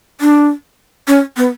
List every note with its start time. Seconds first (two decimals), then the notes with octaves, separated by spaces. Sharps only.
0.21 D4
1.08 C#4
1.37 B3